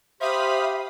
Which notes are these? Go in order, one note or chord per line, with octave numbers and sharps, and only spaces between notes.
G4 C5 E5 F5 B5 D#6